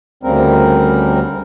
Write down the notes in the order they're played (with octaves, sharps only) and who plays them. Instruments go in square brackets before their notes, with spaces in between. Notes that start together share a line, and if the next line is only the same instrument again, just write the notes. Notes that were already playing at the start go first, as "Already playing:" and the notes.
[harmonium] D2 C#3 G3 C4 A#4